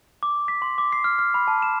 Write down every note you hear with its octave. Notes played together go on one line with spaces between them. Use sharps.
D6
B6
C6
D6
C7
F6
F6
B5
A5
E7